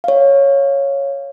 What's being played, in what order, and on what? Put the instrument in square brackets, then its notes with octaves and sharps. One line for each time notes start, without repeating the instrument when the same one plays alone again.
[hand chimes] C#5 F5